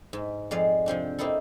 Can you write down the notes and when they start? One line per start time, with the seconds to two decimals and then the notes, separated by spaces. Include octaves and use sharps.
0.13 G#2
0.51 F2 G#3 D5 F5
0.86 C3 F3 C4 D4
1.18 A#3 C4 D#4 E4 A4